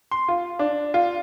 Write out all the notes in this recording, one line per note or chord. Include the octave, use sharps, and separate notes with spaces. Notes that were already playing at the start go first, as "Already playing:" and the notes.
C6
F4
D4
F4